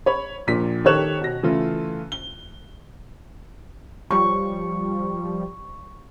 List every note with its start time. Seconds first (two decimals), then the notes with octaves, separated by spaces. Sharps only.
0.06 C#5 B5
0.47 A#1 A#2 B6
0.84 D#3 G4 A4 C#5 F#6 E7
1.21 B2 A#6
1.43 C#3 E3 A3 E4 F4
2.12 G7
4.11 F3 G3 C#6